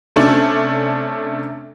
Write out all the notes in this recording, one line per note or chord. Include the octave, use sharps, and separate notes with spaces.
C3 A3 C#4 D4